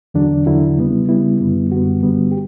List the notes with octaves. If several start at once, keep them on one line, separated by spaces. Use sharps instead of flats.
E2 D3 F#3 D4
E2 D3 F#3 E4
C#3 G3 B3
C#3 G3 B3 E4
F#2 D3 G3 B3
F#2 D3 G3 B3 F#4
G2 D3 G3 B3
G4